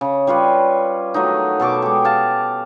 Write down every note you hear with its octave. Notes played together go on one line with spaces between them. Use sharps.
C#3
G3 F4 B4 C#5
D#3 F#3 A3 D#4
B2 A4 C#6 D6
G#3 G4
F5 A5